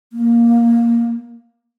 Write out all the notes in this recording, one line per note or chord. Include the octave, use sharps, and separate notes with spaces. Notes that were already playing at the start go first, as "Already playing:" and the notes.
A#3